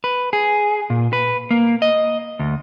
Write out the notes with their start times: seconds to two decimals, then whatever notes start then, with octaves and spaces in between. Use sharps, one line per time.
0.04 B4
0.33 G#4
0.90 A#2
1.13 B4
1.51 A#3
1.82 D#5
2.39 D2